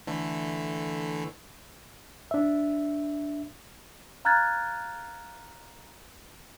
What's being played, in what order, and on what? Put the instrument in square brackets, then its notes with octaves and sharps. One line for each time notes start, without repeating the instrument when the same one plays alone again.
[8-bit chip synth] D3 E3 A3
[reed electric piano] D4 E5
[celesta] F5 A#5 F6 F#6 G#6 A6